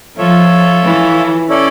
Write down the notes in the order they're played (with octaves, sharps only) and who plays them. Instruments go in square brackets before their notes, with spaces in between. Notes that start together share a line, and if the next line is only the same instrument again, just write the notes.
[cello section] F3 [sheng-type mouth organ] F4 A4 C#5 E5
[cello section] E3
[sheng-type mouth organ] C#4 E4 A4 D5